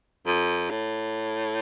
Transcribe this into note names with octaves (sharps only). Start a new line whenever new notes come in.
F2
A2